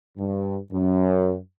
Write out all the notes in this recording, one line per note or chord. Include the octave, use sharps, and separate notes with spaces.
G2
F#2